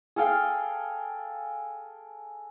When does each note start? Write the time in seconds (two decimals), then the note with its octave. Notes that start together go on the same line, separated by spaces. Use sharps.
0.16 G#4 A4 F5 G5